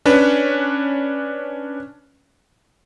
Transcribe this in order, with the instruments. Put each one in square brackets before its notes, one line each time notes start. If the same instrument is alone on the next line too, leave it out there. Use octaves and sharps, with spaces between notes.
[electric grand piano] C#4 D4 B4